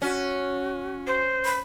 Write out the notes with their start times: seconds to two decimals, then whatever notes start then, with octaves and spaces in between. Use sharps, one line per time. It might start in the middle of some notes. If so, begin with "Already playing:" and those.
0.02 C#4 F#4
1.07 C5
1.45 B5